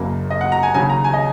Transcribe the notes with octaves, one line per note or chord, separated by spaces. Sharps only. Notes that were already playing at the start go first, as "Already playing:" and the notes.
Already playing: F#1 F#2 C#3 A#3
D#5
F#5
A#5
G#5
D#2 C#3 F#3 G#5
A#5
G#5
D#5